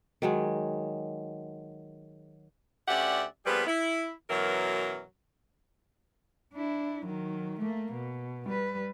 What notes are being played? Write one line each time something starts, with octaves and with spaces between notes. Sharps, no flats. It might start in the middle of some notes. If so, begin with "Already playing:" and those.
D#3 F#3 G#3
D2 C#4 G4 D5 E5 F#5
A#2 F3 G3 B3 G#4 B4
E4
F#2 B2 E3 F#3 A#4
D4 E4
D#3 F#3
A3 A#3
B2
G3 B4